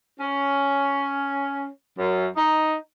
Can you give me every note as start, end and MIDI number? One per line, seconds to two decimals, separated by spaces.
0.20 1.67 61
1.98 2.27 42
2.36 2.76 63